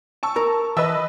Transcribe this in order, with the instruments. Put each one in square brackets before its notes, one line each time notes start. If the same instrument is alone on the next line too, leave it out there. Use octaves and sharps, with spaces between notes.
[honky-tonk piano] A5 C#6 E6
[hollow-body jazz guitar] A#4 A#5
[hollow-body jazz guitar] E3 E5 A5 [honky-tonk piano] B4 D#5 E6